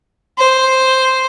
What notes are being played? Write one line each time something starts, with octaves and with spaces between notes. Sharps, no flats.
C5